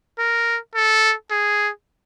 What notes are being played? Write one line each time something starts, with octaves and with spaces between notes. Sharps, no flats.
A#4
A4
G#4